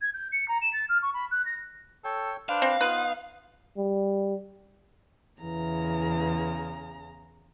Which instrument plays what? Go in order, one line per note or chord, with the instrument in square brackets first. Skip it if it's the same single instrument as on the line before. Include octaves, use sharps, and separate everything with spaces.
[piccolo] G#6
G6
C#7
A#5
E7
A6
F6
C#6
B5
F#6
A#6
[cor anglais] A4 [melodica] C#5 G5
[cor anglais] D4 [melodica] B4 C5 [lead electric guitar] F5
[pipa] C4
[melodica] B3 D#4 [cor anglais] F4 [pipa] B4
[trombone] G3
[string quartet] E2 C#3 A#5 [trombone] E3